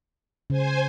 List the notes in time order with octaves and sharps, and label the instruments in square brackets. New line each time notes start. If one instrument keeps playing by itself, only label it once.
[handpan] C#3 [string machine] C5 G#5